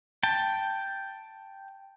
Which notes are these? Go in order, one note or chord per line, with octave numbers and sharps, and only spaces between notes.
G5 A5